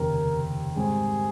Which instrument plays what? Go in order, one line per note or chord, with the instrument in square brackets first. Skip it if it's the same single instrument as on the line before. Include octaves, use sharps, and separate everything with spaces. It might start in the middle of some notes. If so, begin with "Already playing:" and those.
Already playing: [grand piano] F1 D#2 C#3 [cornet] A#4
[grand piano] G#2 G3 C4 G4 [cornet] G#4